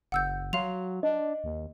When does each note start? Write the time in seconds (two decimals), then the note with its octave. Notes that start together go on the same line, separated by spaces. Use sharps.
0.12 F#1 F#5 E6 G6
0.53 F#3 F5 C6 F7
1.03 D4 D#5
1.44 D#2